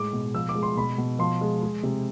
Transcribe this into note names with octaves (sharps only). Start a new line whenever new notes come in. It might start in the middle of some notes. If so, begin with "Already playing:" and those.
Already playing: A2 G#3 D6
B2
F3 E6
D6
G#3
C6
B2 B5
B2
F3 C6
G#3
G#3
C3